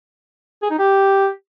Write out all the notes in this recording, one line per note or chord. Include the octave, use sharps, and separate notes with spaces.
G#4
D#4
G4